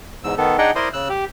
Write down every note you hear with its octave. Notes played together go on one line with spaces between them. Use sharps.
E2 G#2 E6
D#3 B3 A4
D4 D#4 G#4 D#5 F#5 G5
E4 A#4 C5 D5 C6 D#6
C#3 E6 F#6
G4